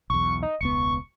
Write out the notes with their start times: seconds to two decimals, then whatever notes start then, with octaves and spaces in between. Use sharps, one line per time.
0.10 B1 E2 C#6
0.43 D#4
0.61 E1 C#2 B3 C#6